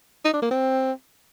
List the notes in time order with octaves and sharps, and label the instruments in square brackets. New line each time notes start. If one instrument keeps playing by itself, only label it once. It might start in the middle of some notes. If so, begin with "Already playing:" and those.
[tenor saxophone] D#4
D4
A#3
C4